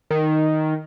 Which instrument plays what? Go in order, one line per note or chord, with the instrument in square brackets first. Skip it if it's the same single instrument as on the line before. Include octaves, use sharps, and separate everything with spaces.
[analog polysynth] D#3